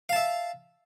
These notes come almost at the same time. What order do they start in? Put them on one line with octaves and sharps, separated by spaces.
F5 A5 E5